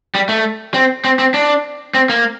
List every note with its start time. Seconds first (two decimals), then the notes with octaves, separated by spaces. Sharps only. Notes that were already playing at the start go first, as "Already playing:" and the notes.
0.15 G3
0.29 A3
0.74 C4
1.04 C4
1.19 C4
1.34 D4
1.94 C4
2.09 A#3